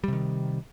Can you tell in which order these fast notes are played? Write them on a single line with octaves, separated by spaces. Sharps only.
G3 C3 D#3